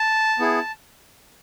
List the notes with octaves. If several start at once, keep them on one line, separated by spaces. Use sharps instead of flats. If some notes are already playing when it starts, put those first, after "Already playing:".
Already playing: A5
B3 E4 G#4